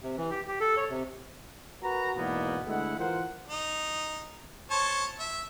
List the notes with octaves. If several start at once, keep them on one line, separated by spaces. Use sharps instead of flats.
C3
E3
G4
G4
A4
C#5
C3
F#4 A#4 B4 A#5
E2 G#2 B2 A#3 B3
D2 G#3 A3 E4 F#5
E3 F4 A#4 C5 F#5
D#4
C5 C#5 A5
E5